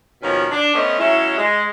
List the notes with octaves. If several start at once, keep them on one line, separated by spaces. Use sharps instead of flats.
D#2 B2 F3 C#4
D4
A3 B3 C#4 C5 C#5 D#5
F#3 G#3 C#4 E4
G#3